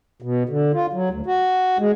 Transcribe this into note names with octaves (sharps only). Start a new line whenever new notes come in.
B2
D3
F4
F#3
D2
F#4
G#3